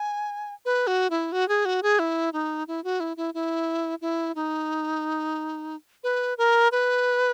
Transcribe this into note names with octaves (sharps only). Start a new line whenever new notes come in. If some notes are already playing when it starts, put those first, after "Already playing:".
Already playing: G#5
B4
F#4
E4
F#4
G#4
F#4
G#4
E4
D#4
E4
F#4
E4
E4
E4
E4
D#4
B4
A#4
B4